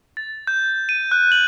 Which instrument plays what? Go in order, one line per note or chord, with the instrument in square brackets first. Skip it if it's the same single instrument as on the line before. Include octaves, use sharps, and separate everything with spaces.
[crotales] A6
G6
D#7
F#6
F#7